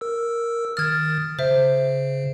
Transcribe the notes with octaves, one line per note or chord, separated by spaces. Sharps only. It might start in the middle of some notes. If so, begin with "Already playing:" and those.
A#4 E6
D#3 D#6 F6 G#6 A6
C#3 C5 E5